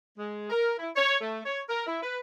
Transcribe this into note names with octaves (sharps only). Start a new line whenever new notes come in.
G#3
A#4
E4
C#5
A3
C#5
A#4
E4
B4